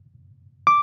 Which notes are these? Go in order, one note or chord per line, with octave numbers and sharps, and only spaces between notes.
D6